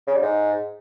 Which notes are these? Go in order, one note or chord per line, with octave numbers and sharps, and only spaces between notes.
C#3
G3
G#2